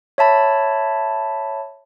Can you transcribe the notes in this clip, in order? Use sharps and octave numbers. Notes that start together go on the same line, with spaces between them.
C#5 E5 A5 B5